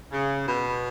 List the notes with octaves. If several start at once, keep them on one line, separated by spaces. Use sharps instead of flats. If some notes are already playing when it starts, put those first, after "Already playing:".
C#3
B2